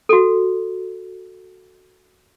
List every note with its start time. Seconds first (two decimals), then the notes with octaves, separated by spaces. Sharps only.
0.09 F#4 A4